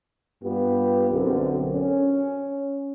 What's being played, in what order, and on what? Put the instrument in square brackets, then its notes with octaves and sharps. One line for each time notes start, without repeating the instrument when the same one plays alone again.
[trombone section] G2 B3 F4 G4
B1 F#2 D3 C4
C#4